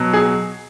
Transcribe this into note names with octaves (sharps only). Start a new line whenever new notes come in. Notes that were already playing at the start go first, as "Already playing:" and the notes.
Already playing: B2 F#3
G#4